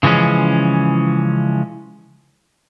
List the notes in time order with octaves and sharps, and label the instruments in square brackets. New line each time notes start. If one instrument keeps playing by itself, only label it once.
[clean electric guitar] C#3 E3 F3 G#3 C#4